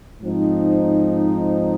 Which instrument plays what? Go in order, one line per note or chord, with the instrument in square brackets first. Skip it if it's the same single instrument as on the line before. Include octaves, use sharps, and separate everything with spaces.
[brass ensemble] G#2 F3 C4 D#4